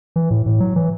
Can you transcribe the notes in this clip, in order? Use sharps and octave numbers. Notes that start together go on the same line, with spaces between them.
E3
A2
A2
F#3
E3